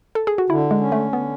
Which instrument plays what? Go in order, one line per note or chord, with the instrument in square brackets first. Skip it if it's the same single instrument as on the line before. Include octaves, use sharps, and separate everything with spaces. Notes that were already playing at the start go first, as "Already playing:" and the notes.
[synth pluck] A4
G#4
F#4
[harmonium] D3 [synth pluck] E4
[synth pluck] G#3
[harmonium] C#4
[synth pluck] A3
[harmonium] D3 [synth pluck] B3